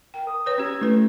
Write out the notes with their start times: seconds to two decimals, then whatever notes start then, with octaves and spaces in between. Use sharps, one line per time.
0.14 A#4 G5
0.27 D#6
0.46 B4 C#5
0.58 C#4 G4 G#6
0.81 A3 E4 B4